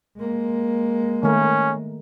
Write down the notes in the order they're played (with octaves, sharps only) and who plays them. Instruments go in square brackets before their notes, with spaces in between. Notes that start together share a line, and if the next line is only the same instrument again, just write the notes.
[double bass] G#3 A#3
[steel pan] D#3 A3 A#4 [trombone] C#4